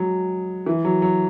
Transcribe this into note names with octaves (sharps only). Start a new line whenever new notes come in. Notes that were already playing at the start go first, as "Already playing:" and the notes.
Already playing: F#3 G#3
E3
F#3
F#3